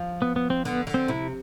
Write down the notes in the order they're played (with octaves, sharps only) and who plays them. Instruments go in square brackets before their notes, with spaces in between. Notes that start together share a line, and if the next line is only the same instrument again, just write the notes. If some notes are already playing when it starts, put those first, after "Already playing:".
Already playing: [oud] F3
[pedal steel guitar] B3
B3
C4
[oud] D3 [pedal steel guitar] B3
[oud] D3
[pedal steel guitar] C4
[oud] C3 [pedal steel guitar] E4